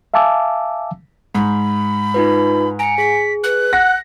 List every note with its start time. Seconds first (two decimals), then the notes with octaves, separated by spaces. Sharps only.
0.14 E5 F5 G#5 A5 D6 E6
1.35 G#2 B5
2.14 D#4 F4 B4
2.79 G#5 A#5 C#7 D7
2.98 G#4 B6
3.44 B4 F#6
3.73 F#5 A#6